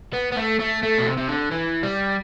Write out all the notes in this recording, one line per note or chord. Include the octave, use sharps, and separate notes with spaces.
B3
B3
A3
A3
A3
B2
C3
C3
D3
E3
G3